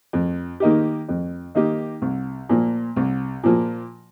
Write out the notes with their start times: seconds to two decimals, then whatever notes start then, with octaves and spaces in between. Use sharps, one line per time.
0.13 F2
0.60 D#3 A#3 D#4 G4
1.09 F2
1.55 D#3 A#3 D#4 G4
2.02 C2
2.49 A#2 F3 A#3
2.96 C2
3.43 A#2 F3 A#3